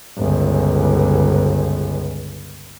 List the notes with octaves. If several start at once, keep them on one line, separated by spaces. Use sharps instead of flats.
G1 C#2